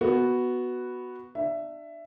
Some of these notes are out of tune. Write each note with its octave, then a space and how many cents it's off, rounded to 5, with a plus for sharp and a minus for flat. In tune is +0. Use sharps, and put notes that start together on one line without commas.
B3 +0 F#4 +0
D4 +35 E5 +15